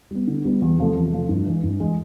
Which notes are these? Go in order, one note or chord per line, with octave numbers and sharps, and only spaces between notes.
G3 B3
D3
G3 B3
E2
C3 F3 A3
E2
C3 F3 A3
G2
E3 G#3
G2
E3 G#3